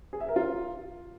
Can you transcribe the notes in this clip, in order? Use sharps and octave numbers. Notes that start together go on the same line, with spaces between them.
G#4
E5
A#4
F4